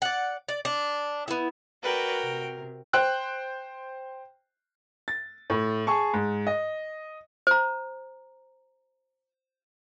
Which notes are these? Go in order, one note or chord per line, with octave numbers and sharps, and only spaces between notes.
D5 F#5
D5
D4
B3 E4
F#4 A#4 B4 D5 G5
C3
C5 G5 F#6
A6
A2
G#4 A5 C#6
G#2
D#5
C5 A#5